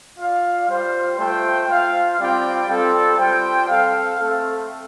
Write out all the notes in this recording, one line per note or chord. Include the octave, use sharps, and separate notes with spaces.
F4 D5 F5
G3 F4 C5
A3 F4 C5 G5
F4 C5 F5
G3 C4 F4 D5 G5
G3 C4 F4 A4
G3 F4 C5 G5
C4 A4 F5
A3 C4 A4